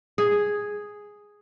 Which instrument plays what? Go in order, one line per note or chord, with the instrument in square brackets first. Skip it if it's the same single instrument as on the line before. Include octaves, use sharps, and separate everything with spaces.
[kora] G#4